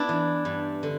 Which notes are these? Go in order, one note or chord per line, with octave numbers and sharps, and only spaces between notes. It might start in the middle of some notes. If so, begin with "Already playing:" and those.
Already playing: B3 D4 E4
E3
G2
D3